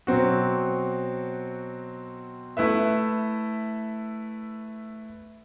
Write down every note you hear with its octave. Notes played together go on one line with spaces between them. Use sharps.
B2 F#3 C4 F#4
A3 E4 B4 E5